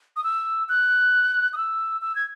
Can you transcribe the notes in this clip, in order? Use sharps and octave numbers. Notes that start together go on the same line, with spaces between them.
D#6
E6
F#6
D#6
E6
E6
G#6